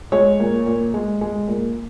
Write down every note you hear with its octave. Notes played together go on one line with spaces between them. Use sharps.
G#3 C#5
A#2
A#2
G#3
G#3
A#2